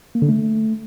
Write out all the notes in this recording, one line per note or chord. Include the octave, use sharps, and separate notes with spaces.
A#3
D3
A3